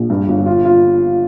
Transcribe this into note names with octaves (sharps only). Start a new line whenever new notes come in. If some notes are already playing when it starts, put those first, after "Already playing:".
Already playing: A#1
G2
G1
F4
F4